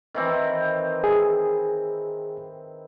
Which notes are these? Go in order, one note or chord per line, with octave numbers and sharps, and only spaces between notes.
D#3 E3 C4
G#4